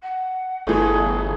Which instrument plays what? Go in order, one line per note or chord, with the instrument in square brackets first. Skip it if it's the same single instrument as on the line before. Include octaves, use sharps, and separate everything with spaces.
[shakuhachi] F#5
[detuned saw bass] G1 [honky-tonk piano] E3 A3 [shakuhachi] G#4